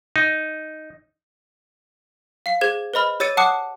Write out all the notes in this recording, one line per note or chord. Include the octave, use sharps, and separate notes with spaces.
D#4
F5 C7
G#4 C5 G#6
B4 C5 D#5 B5 F6
G4 C#5 E6 A6 C#7 D#7
F#5 A5 D6 D#6 F#6 C#7